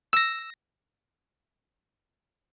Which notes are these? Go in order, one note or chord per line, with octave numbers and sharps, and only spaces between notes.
E6 A#6